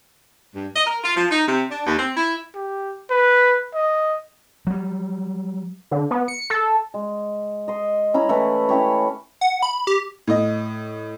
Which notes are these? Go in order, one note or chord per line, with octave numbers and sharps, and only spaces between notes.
G2
D#5
A#4
F4
F3
D#4
C3
D4
D#2
C4
E4
G4
B4
D#5
F#3 G3
D3
B3
C#7
A4
G#3
D#5 C6
C#4 E4 A#5 B5
E3 A3 B4 B5
C#4 E4 G4 C#5
F#5
B5
G4
A2 D#5